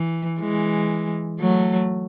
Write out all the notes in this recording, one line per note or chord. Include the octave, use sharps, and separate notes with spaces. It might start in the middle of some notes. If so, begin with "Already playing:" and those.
Already playing: E3
E3 G#3
F#3 A3